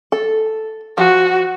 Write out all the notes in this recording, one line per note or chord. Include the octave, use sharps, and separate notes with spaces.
A4
F3 F#4